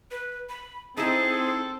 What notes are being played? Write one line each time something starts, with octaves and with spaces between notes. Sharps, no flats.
B4
B5
C4 D#4 E4 G#4 A4